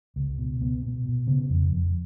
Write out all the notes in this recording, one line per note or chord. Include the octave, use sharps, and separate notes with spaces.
C#2
B2
C#2 B3
B2
B2
C#3 B3
F2
F2